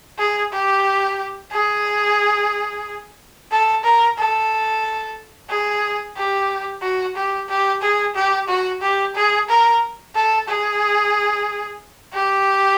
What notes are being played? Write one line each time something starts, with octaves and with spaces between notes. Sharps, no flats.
G#4
G4
G#4
A4
A#4
A4
G#4
G4
F#4
G4
G4
G#4
G4
F#4
G4
G#4
A#4
A4
G#4
G4